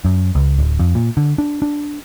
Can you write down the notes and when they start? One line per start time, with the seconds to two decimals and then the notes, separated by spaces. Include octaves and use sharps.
0.05 F#2
0.35 C#2
0.58 D1
0.79 F2
0.95 A#2
1.17 D3
1.38 D4
1.62 D4